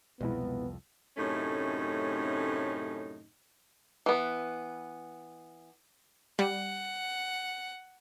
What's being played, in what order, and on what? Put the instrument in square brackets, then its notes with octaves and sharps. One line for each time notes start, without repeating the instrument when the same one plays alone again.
[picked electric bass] C2 F2 [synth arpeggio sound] B2 G#3 E4 [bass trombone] B3
[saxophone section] F#2 A2 C3 A3 C#4 D#4
[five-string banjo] E3 B3
[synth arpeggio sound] G3 [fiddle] F#5